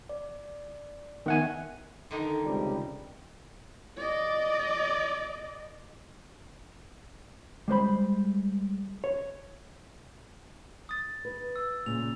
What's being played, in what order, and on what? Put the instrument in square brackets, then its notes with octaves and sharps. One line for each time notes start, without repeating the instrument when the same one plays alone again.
[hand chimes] D5
[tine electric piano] D#3 F#5 G#5 [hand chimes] B3 E5
[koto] D3 D#3 D#4
[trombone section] C#2 C3 G3
[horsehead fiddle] D5 D#5
[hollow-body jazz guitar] G3 G#3 C5 B5
C#5
[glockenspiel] D#6 A6
[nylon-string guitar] B4
[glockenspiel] E6
[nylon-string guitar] A#2 C#3 [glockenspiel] F7